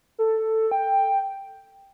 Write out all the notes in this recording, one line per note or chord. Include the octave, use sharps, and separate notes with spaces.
A4
G5